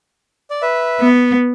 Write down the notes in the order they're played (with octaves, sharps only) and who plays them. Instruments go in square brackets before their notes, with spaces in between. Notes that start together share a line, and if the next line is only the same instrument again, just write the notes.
[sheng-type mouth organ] D5
B4 E5
[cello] B3